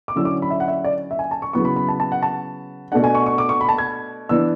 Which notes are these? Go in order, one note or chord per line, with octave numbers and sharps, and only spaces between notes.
D6
D3 F#3 C#4 E4 E6
D6
B5
E5
F#5
E5
D5
E5
G#5
A5
C#6
C#3 F#3 B3 E4 C#6
B5
B5
A5
A5
F#5
A5
B2 A3 D4 F#5
G#5
C#6
C#6
D6
C#6
B5
A5
G#6
E3 B3 D4 E6